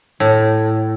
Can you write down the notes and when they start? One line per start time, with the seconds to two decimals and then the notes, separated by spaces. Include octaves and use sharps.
0.20 A2